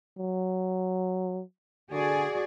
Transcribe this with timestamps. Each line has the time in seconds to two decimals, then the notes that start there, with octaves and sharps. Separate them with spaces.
0.18 F#3
1.92 D3 F#4 G#4 D5